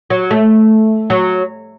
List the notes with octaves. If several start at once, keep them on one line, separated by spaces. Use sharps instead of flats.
F#3
A3
F#3